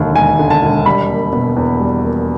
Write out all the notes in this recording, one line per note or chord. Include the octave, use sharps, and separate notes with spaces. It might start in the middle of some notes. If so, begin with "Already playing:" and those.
Already playing: E1 D#2 D3
E1 G#5
D3
A5
E1
G3 B5
A#3
B2
E2
G3
A#3